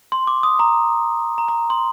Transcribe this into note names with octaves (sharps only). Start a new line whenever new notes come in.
C6
D6
D#6
A#5
A#5
A#5
C6